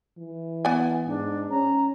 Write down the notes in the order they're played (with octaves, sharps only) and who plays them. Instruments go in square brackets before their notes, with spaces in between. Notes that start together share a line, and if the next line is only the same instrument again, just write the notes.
[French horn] E3
[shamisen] B3 G#5
[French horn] G#2 [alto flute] D4
[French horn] C#4 [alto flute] A#5